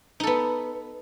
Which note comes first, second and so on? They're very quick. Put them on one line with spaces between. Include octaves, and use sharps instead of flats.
D#4 A4 B3